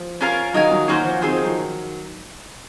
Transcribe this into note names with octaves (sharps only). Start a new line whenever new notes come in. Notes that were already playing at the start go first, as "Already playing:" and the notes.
Already playing: F3
C#4 F4 A#4 F5
D#3 F#3 D#4 A#4 F5 G#5
D#3 F#3
D#3 F#3 A#3 C#4 F#4 C5
F3
D#3 C4 D#4 G#4 C5
F3
D#3 F#3